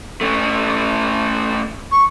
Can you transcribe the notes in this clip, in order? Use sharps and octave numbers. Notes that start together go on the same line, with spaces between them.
A3 C#4
C#6